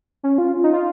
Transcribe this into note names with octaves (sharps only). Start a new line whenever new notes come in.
C#4
F4
D#4
F4